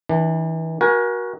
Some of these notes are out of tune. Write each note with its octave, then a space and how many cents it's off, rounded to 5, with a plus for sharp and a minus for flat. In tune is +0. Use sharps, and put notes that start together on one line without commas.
E3 -30 D4 +10
F#4 +0 A#4 +35 G#5 +0